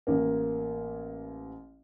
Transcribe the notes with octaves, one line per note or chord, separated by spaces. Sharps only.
A1 A#3